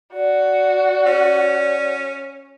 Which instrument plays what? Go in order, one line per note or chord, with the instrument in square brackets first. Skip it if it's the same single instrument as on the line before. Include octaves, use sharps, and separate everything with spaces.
[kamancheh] F#4 [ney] D5
[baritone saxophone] C#4